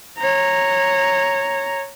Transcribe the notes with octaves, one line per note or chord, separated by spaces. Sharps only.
C#5 A#5